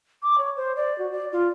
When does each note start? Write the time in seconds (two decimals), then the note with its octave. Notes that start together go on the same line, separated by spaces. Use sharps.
0.23 D6
0.38 C#5
0.57 C5
0.76 D5
0.99 F#4
1.12 D5
1.32 F4